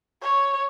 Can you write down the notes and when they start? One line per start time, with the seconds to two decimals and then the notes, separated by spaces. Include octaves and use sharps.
0.22 C#5